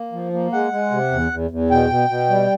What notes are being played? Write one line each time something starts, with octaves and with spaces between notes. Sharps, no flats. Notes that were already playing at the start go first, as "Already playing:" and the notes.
Already playing: A#3
F3
A#3
G#3 F#5
G#3
C3
E2
E2
E2
B2 G5
B2
B2
G3